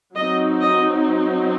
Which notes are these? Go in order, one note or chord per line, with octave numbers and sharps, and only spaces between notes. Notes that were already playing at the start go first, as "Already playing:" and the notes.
F#3 C4 D#4 D#5
D#5